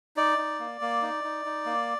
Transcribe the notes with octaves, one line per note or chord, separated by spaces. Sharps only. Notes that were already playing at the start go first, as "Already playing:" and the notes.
D#4 D5
D#4
A#3
A#3
D#4
D#4
D#4
A#3